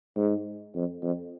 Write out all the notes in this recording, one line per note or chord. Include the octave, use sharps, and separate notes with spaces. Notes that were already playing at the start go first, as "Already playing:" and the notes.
G#2
F2
F2